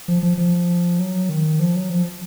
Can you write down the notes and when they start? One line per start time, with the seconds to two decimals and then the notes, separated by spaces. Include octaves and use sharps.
0.08 F3
0.23 F3
0.38 F3
0.99 F#3
1.29 D#3
1.59 F3
1.75 F#3
1.89 F3